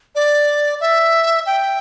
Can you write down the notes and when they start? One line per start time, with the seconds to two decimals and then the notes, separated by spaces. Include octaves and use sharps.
0.15 D5
0.81 E5
1.46 G5